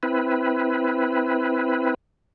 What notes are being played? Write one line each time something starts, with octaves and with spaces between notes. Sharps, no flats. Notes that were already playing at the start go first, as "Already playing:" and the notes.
C4 E4 B4